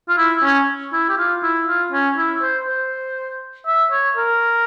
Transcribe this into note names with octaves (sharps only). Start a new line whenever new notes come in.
F4
E4
C#4
E4
G4
F4
E4
F4
C#4
E4
C5
C5
E5
C#5
A#4